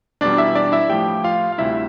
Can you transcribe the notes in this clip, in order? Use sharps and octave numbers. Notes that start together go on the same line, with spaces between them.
E2 B2 G3 D4 D5
E4 E5
D4 D5
E4 E5
A2 F3 G4 G5
F4 F5
F5
D2 C3 G3 E4 E5